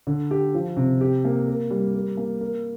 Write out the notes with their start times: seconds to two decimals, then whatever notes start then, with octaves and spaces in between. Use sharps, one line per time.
0.07 D3
0.31 G4
0.54 F3
0.77 C3
1.01 G4
1.25 A#3
1.48 A#4
1.71 G3
1.95 A#4
2.17 A#3
2.41 A#4